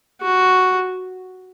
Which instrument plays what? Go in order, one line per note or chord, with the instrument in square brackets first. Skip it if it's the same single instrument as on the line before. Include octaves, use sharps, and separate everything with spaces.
[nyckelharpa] F#4